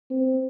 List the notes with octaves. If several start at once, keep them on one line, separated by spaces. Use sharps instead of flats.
C4